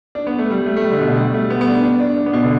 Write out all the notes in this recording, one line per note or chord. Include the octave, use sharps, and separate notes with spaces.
D4
B3
A3
G3
A3
A3
G3
D3
B2
D3
G3
A3
B3
B3
D4
D4
D4
D4
B3
B2
D3